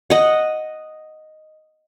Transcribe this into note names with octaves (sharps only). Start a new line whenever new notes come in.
D#5 F#5